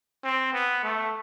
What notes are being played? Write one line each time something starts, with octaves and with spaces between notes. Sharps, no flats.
C4
B3
A3